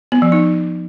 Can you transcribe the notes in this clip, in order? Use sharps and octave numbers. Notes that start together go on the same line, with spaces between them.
B3
F3
D#4